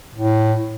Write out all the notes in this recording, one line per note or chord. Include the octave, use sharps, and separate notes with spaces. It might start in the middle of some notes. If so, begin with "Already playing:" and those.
A2